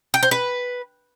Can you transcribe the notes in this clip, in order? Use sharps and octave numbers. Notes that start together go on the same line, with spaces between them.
G5
C5
B4